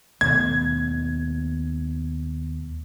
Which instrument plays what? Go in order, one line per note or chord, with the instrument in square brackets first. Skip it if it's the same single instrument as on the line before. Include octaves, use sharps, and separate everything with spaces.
[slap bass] D#2 B2 A3 [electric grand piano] G#6